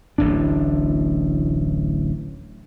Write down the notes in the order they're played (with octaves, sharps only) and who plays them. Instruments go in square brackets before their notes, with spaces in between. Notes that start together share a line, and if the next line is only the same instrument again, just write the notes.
[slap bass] D1 A1 A2 D4